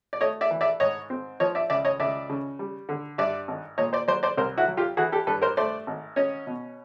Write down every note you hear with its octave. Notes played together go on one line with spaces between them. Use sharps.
D5
A3 C#5 D#5
D5 E5
E3
D5 E5
G#2 C#5 D#5
C4
F3 C#5 D#5
D5 E5
C#2 D5 E5
C#5 D#5
C#2 D5 E5
C#3
G3
D3
G2 D5 E5
G#1
A#2 C#5 D#5
C5 D5
F#3 C5 D5
C5 D5
C2 A#4 C5
E4 F#4
F#3
F4 G4
E3 F#4 G#4
G4 A4
G2 A4 B4
A#4 C5
A3 C5 D5
G#1
C#4 C#5 D#5
B2